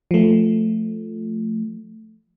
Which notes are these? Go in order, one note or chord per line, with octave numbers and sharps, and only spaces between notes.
F3 A3